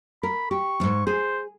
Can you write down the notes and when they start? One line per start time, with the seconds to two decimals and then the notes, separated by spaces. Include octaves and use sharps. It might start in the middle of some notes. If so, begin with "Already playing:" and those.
0.23 A#4 B5
0.51 G4 C#6
0.80 F2 G#2
1.07 G#4 C5